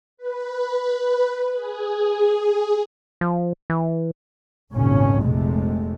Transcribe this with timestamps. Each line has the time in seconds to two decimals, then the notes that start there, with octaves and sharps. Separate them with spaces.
0.17 B4
1.54 G#4
3.21 F3
3.70 E3
4.74 G#1 E2 A#2 C#3 C#4
5.24 F1 A#1 C3 G#3 A3